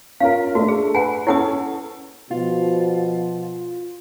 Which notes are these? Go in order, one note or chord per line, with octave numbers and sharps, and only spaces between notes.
C#4 F4 A#4 F5
A3 D4 F#4
G#4
B4 F#5 G#5
C#4 E4 A4 C#5 F#5 D#6
B2 F3 F4